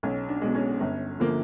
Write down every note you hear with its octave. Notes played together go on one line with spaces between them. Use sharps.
B1 C#4
D4
B2 G#3
C#4
G1
D3 F3 A#3